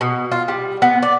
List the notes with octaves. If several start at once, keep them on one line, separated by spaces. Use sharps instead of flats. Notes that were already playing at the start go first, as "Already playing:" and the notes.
B2
F4
G3
B3
D5